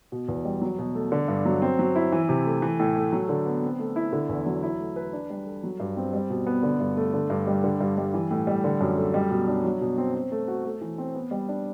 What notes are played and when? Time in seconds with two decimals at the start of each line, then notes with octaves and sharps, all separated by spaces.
0.12 B2
0.28 E2
0.45 G3
0.62 F#3
0.78 B2
0.95 A3
1.12 D3
1.28 G2
1.45 F#3
1.62 C4
1.79 F#3
1.95 E4
2.12 E3
2.29 C3
2.46 A3
2.62 E3
2.79 A2
2.96 A3
3.13 F#3
3.29 D3
3.46 B3
3.63 C4
3.79 A3
3.96 E4
4.13 D3
4.29 E2
4.46 F#3
4.63 E4
4.80 A3
4.96 B4
5.13 D4
5.30 G3
5.47 A4
5.64 F#3
5.80 G2
5.97 C4
6.13 G3
6.30 B2
6.47 B3
6.63 D3
6.80 G2
6.97 A3
7.13 D3
7.30 G2
7.47 G3
7.64 D3
7.80 G2
7.98 G3
8.14 E3
8.31 A2
8.47 G3
8.64 D3
8.81 F#2
8.98 A3
9.14 G3
9.31 B2
9.48 D4
9.65 F#3
9.81 B2
9.98 C4
10.14 C4
10.32 A3
10.48 F#4
10.65 A3
10.81 E3
10.98 C4
11.15 B3
11.31 G3
11.49 D4